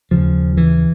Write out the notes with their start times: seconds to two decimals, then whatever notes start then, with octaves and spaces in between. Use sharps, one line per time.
0.11 D#2 C#3 F3
0.57 E3